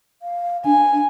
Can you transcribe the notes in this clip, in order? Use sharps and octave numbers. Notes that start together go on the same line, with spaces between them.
F5
D4 G#5